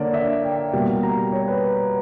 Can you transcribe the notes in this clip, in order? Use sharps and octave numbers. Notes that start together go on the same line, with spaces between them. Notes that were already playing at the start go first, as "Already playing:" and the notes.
Already playing: D3 A#3 C#5 D5
E5
G5
B2 G3 A#3 G5
A#5
C#5
B4